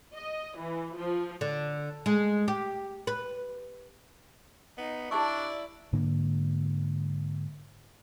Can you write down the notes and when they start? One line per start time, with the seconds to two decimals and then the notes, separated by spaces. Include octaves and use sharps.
0.14 D#5
0.59 E3
0.99 F3
1.41 D3
2.06 G#3
2.48 G4
3.07 B4
4.78 B3 D#4
5.11 D4 E4 G4 D5 A5 C#6
5.93 G#2 D3 A#3 D4